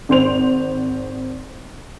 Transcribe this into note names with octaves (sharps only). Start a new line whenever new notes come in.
G#1 C5 F7